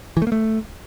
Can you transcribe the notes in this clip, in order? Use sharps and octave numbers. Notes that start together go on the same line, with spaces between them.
E3
A3
A#3
A3